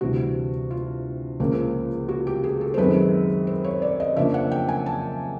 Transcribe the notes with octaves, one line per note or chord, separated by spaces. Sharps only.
D2 C3 E3 G3 F#4
F4
C#2 C#3 F3 A#3
F#4
G4
G#4
A4
C5
F#2 D#3 G#3 C4 B4
C5
C#5
D5
D#5
F2 C#3 F3 A#3 D4 E5
F#5
G5
G#5
A5